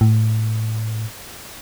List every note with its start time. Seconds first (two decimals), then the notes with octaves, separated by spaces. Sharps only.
0.01 A2